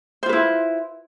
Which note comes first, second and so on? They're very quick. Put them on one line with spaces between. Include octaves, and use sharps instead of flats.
C5 F4 B4 E4